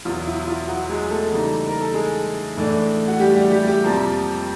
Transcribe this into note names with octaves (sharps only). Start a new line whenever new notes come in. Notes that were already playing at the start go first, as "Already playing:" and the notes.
E2 B2 F#3 F4
E4
F4
F#3 F#4
G#3 G#4
A3 A4
C#3 E3 G3 A#3 D#4
A#4
A4
G#3 G#4
A2 E3 A3 D4
F#4
G3 G4
G3 G4
G3 G4
G3 G4
F2 C3 F3 A#3